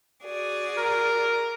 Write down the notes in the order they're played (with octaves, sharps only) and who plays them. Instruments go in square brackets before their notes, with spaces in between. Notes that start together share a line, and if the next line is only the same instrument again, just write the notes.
[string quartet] F#4 G#4 D5
[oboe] A#4